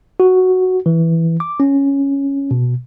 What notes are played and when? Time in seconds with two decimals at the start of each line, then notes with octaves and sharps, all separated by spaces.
0.20 F#4
0.86 E3
1.40 D6
1.60 C#4
2.51 B2